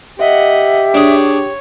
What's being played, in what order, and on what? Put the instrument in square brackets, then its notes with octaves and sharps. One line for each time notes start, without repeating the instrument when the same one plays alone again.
[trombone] G4 [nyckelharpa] D#5 F#5 [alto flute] E5
[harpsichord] D4 G#4 [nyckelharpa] C#5